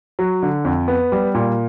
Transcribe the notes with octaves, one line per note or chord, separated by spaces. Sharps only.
F#3
D3
F2
B3
G3
A#2